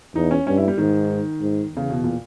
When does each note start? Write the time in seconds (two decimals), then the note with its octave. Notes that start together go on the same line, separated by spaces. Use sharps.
0.15 E2 D#4
0.31 C#4
0.47 G2 C#4
0.57 E4
0.68 G3
0.78 G#2 D#3
1.41 G#2
1.72 E2 C#3
1.90 B2
2.04 A#2